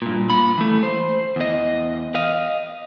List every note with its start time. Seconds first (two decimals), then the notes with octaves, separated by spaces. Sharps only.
0.02 G2 A#2
0.30 A#3 B5
0.58 E3 A3
0.83 C5
1.36 E2 D#5
2.15 D#5 F5